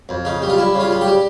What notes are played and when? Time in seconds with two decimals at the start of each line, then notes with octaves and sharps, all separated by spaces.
0.09 F2
0.25 C#3 D#4
0.42 G3
0.49 F4
0.58 G3 E4
0.74 C#3
0.80 F4
0.91 G3
1.01 G4
1.07 G3